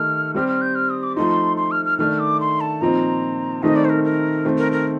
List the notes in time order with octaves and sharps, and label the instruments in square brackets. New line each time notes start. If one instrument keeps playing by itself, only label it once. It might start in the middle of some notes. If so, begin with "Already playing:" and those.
Already playing: [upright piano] D#3 A3 D#4 G4 [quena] F6
[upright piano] G3 C4 G4 [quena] F6
[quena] F6
G6
F6
D#6
D6
[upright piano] F3 A3 D#4 [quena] C6
[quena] C6
F6
F6
[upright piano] D#3 A3 D4 [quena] F6
[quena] D6
C6
A5
[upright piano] A#2 F3 C4 D#4 [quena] A#5
[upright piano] D#3 A3 C4 D#4 [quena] D#5
[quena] D5
C5
A#4
A#4
[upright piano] D#3 A3 C4
[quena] A#4
A#4